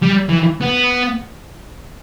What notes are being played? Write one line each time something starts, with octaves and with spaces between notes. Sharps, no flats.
G3
E3
B3